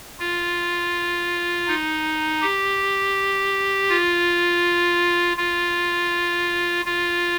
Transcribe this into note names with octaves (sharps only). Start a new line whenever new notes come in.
F4
D#4
G4
F4
F4
F4